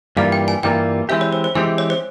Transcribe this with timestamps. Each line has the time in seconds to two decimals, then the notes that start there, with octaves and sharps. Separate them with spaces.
0.17 G2 E3 G3 A#3 F4 F5
0.32 G5
0.48 G#5
0.63 G2 E3 G3 A#3 F4 G5
1.09 E3 G#3 C4 G4 E5
1.21 C#5
1.33 C5
1.44 C5
1.55 E3 G#3 C4 G4 E5
1.78 C#5
1.90 C5